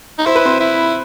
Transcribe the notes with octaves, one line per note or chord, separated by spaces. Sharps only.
D#4
E4 C5
B4
C4 C5
E4